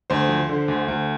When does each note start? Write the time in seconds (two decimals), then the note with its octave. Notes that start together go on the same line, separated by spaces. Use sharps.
0.10 D2 C5 C6
0.29 F3
0.49 D3
0.68 D2
0.88 D2